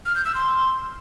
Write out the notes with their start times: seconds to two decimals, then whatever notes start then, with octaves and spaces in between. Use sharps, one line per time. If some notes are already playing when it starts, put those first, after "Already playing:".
0.06 F6
0.15 G6
0.25 E6
0.35 C6